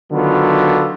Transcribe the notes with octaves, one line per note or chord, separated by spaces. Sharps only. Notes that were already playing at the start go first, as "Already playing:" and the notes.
D3 D#3 F#3 B3 F4